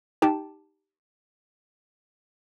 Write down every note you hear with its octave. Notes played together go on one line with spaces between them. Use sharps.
D#4 G4 G5 A5